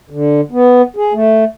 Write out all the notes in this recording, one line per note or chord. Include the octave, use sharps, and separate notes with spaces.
D3
B3
G#4
A3